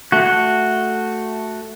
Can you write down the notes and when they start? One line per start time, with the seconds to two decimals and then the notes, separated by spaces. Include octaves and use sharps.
0.12 A3 F#4